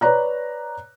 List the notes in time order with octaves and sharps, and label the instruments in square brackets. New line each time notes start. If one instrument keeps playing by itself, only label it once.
[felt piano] B4 C#5 D5 A#5 F#6